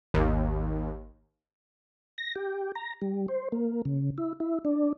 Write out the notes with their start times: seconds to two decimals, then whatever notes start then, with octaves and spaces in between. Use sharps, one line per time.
0.14 G#1 D#2
2.18 A#6
2.35 G4
2.75 A#5
3.02 G3
3.28 C5
3.52 A#3
3.85 C#3
4.18 E4
4.40 E4
4.65 D4